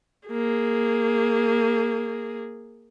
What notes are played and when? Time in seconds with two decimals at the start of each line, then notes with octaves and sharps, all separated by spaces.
0.28 A#3 G#4